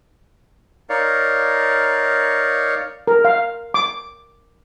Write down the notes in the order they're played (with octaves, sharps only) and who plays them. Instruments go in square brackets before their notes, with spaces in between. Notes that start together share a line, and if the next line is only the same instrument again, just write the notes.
[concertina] D#4 A#4 C#5 D5 F5
[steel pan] A#4
F5
D6